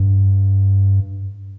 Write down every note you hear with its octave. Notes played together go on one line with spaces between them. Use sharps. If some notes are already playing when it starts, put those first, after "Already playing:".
Already playing: G2